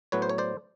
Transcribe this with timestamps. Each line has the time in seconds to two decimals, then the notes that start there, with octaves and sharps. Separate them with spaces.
0.12 A2 F#3 B3 B4 C#5
0.22 C5
0.29 C#5
0.38 C5 D5